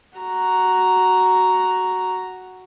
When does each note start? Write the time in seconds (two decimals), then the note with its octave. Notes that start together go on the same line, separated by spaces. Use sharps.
0.19 F#4 A#5